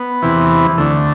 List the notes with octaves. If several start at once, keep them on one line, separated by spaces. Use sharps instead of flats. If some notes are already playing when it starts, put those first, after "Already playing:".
Already playing: B3
E2 C3 E3
D2 D3 A3